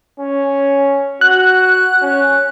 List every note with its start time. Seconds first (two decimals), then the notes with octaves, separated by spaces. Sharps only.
0.19 C#4
1.21 F#4 F#6
2.02 C#4